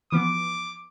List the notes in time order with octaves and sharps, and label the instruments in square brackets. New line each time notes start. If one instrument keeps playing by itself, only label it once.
[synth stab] E3 F3 B3 [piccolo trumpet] D6